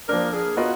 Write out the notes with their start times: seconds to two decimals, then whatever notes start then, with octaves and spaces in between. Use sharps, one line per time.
0.09 F3 A#3 D4 A#4
0.34 G#4
0.57 B3 F4 F#4 A#4 D#5